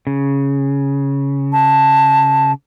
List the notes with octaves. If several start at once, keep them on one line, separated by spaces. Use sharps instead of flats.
C#3
A5